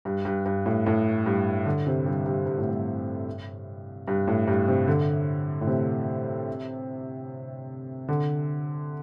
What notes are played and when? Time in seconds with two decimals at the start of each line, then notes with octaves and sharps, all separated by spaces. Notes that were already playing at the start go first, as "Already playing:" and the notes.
0.05 G2
0.25 G2
0.46 G2
0.66 A2
0.86 A2
1.26 G2
1.66 D3
1.87 C3
2.06 G2
2.26 G2
2.46 G2
2.58 A2
2.69 G2
4.08 G2
4.27 A2
4.48 G2
4.68 C3
4.88 D3
5.61 A2
5.67 C3
8.08 D3